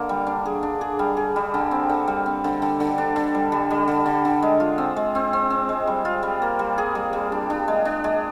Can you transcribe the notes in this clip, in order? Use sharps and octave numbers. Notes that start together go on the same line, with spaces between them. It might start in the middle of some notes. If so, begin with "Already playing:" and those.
Already playing: D3 A#3
G3
D4
G#4
D4
G#4
G3
G#4
G3
D3
C4
D3
G3
C4
D3
D3
D3
D4
D3
G3
G3
G3
D3
D3
D3
G#3
F4
C4
G#3
C4
C4
C4
G#3
G3
F4
G3
A#3
G3
G#4
G3
G3
D4
D4
G#3
D4
G#3